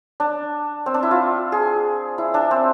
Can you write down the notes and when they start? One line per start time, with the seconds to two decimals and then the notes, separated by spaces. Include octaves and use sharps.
0.20 D4
0.86 C4
0.94 D4
1.03 E4
1.11 F4
1.52 G#4
2.18 E4
2.34 D4
2.51 C4